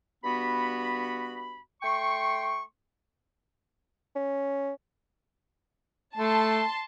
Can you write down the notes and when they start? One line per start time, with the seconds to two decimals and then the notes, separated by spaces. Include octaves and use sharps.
0.23 G2 B3 F#4 B5
1.82 A3 G5 C6 C#6
4.15 C#4
6.17 A3 A5 C6